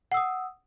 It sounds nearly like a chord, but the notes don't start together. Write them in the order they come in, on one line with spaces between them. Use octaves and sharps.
F#5 E6 D#6